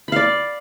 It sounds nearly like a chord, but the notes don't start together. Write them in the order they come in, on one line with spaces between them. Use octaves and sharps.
B5 F5 D5